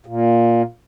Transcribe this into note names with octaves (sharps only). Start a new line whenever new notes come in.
A#2